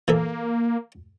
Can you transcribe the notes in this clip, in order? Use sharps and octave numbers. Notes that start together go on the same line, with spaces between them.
E3 A#3 A4 E5